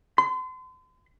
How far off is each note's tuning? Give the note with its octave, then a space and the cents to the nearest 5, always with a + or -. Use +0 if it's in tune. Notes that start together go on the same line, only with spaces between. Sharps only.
C6 -40